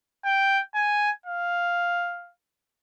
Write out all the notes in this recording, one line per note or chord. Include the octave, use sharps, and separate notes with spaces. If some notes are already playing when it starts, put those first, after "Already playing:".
G5
G#5
F5